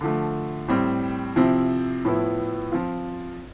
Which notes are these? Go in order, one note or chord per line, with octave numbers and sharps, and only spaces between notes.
D3 F3 A3
A2 G3 C4
C3 F3 C4 E4
A2 F3 B3 E4
F3 C4 F4